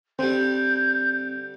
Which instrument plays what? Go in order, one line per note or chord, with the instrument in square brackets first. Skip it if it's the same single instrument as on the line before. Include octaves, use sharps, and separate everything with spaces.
[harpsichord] D3 G3 [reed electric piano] C4 [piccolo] G6